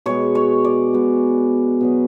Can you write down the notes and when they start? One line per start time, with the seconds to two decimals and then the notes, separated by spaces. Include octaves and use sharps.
0.06 B2 G#3 B3 C#5
0.35 C#5
0.64 D5
0.93 B2 G#3 B3
1.81 B2 F#3 B3